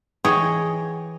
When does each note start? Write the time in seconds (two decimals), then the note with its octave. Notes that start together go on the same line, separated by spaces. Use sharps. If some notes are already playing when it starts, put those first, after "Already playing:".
0.25 E3 G#4 C#5 D#5 F#5 G5